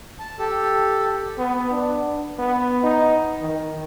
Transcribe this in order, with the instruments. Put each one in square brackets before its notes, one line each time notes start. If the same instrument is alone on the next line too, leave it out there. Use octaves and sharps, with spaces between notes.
[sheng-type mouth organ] A5
G4 A4
[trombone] B3
D4
B3
D#4
D#3